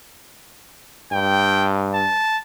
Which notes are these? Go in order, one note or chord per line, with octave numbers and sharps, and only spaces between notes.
G2 G5
A5